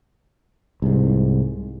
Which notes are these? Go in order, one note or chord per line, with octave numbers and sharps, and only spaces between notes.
C2 G#2